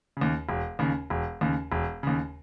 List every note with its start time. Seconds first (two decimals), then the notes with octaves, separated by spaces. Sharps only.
0.17 D#2 C#3
0.49 E1
0.79 D#2 C#3
1.10 E1
1.41 D#2 C#3
1.72 E1
2.03 D#2 C#3